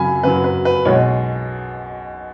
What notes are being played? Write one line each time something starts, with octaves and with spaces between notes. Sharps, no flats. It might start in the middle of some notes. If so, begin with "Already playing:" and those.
Already playing: F#2 C#3 F#3 G#5 B5
F#2 C#3 F#3 B4
B4
B4
B1 B2 G#3 C#5